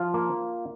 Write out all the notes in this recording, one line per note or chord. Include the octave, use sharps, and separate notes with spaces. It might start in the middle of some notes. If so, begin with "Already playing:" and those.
Already playing: F3 F4
A#3